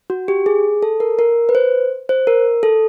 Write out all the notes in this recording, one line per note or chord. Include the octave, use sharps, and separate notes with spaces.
F#4
G4
G#4
A4
A#4
A#4
B4
C5
C5
A#4
A4